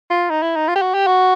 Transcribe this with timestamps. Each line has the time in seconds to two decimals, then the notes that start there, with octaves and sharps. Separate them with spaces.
0.10 F4
0.30 D#4
0.42 E4
0.56 D#4
0.68 F4
0.75 G4
0.82 F#4
0.94 G4
1.07 F#4